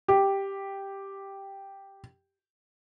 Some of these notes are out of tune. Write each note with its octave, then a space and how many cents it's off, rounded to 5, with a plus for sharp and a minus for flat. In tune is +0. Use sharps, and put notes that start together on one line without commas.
G4 +0